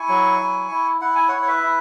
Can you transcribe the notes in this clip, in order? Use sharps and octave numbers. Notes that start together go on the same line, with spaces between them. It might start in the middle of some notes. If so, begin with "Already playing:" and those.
Already playing: E4 G#5 C#6
F#3
E4
E4
E4 F#5
G#5
E4 C#5 F#5
C#5
B4 E5
E4